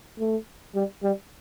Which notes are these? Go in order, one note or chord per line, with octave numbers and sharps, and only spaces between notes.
A3
G3
G3